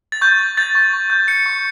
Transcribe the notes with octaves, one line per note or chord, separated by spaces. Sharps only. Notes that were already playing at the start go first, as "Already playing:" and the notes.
A6
C#6 G6
G6
G6 A6
C#6
C#6
G6
G6 C#7
C#6